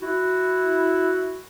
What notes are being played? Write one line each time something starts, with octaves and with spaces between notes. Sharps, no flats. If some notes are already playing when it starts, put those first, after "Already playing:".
E4 F#4